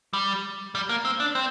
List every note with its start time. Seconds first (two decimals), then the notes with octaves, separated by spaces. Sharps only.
0.13 G3
0.75 G3
0.89 A#3
1.05 C4
1.20 D4
1.35 C4